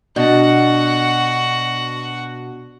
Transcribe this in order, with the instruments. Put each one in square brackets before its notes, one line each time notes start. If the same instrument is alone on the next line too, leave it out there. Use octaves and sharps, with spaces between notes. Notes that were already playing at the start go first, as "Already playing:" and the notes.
[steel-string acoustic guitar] B2 D4 [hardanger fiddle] F#4 F#5